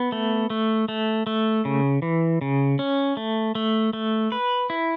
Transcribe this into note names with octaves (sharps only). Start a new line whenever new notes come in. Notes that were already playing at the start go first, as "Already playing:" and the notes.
Already playing: B3
A3
A3
A3
A3
C#3
E3
C#3
C#4
A3
A3
A3
B4
E4